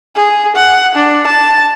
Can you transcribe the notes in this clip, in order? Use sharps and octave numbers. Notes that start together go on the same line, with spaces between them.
G#4
F#5
D4
A5